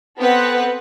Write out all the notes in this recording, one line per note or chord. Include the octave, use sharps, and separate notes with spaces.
B3 C4 A4 B4 F#5